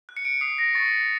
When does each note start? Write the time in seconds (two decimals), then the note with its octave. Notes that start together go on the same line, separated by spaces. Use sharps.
0.09 F#6
0.17 C#7
0.25 D7
0.41 D#6 C7
0.58 A#6
0.75 C#6 A6